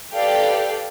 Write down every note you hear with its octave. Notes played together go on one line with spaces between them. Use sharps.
G4 A4 B4 D5 F5 G5